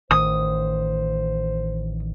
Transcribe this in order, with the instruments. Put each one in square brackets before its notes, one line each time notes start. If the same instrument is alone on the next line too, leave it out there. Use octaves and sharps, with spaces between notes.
[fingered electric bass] A1 D#3 [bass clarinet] C5 [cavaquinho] D#6